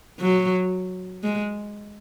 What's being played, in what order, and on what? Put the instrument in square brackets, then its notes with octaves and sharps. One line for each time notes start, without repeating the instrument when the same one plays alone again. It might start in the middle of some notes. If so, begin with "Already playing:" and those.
[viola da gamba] F#3
G#3